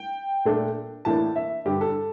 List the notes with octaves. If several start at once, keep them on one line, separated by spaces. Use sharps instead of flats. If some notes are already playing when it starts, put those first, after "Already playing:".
Already playing: G5
A#2 A3 D4
A2 E3 A#3 D4 A5
E5
G2 D3 G3 G4
A4